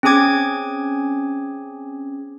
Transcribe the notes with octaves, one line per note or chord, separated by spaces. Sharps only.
C4 C#4 G#4 G#5 D6 G#6